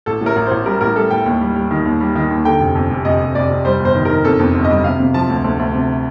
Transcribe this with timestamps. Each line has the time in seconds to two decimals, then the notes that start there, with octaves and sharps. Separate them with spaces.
0.06 A1 A4
0.21 A2
0.26 A#4
0.36 A1
0.46 A1 C5
0.66 G3 A#4
0.81 A1 A#4
0.96 G3 A4
1.11 A1 G5
1.26 D#2
1.41 G3
1.56 G3
1.71 D#3
1.85 D#2
2.00 G3
2.15 D#3
2.31 D#2
2.45 D3 G5
2.60 F1
2.75 F2
2.90 F1
3.05 F1 D#5
3.20 F1
3.35 F1 D5
3.50 F1
3.65 G3 C5
3.80 G1
3.85 C5
3.95 D#3
4.05 D#3 A#4
4.24 F2 A4
4.40 F2
4.55 G1
4.64 D#5
4.70 G3
4.84 C3 F5
4.99 C3
5.14 F3 A5
5.29 D2
5.44 D2
5.59 D2
5.74 C3